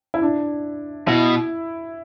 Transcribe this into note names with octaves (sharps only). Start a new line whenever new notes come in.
E4
D4
B2 E4